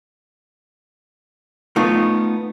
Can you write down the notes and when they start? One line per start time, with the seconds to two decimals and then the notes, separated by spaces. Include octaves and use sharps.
1.76 A3 B3 D#4 F4